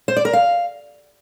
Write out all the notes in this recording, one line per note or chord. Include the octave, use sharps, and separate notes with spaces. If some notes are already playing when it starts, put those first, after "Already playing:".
C5
D5
A#4
F5